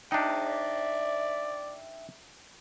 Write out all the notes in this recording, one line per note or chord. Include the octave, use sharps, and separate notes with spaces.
D4 D#4 E5 G5
D5